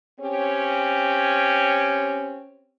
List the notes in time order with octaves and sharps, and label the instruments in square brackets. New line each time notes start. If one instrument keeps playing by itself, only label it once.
[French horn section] C4 C#4 G4 C#5